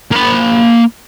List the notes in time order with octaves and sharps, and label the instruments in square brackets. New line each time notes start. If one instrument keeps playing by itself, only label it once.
[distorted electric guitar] A#3 B5